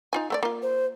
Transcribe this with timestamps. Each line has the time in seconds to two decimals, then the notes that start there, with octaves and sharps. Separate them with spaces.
0.13 D#4 F4 G#5
0.30 A3 C4 D5
0.43 A#3 F4
0.62 C5